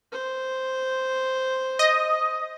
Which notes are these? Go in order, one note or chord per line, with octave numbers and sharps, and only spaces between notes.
C5
D#5